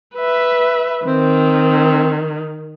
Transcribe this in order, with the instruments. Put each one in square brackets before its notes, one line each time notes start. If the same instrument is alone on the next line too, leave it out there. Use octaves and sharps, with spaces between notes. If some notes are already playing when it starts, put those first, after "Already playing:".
[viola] B4 E5
[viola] D#3 [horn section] C4